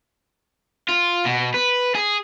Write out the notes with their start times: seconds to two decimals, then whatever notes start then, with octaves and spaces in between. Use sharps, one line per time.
0.89 F4
1.25 B2
1.54 B4
1.95 G#4